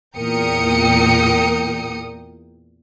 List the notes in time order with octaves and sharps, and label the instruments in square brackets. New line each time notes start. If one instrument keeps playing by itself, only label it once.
[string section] E2 A#2 A#4 G5 D#6 C#7